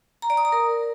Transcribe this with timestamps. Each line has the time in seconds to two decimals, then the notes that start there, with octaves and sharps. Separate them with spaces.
0.22 A#5
0.30 D5
0.37 D#6
0.45 A#5
0.52 A#4